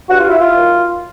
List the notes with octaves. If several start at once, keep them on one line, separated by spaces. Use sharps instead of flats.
G2 F#4
F4
E4
F4
D#3 F#3